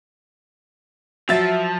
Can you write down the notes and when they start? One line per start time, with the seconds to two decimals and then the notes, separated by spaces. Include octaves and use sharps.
1.29 F3 F#3 E5 A6